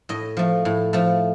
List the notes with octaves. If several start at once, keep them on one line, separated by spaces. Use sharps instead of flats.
A2 D#5
F3 A3
A2
F3 A3